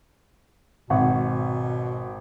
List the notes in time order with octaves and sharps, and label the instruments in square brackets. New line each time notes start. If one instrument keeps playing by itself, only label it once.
[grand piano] G#1 F#5 C#6 [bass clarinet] B2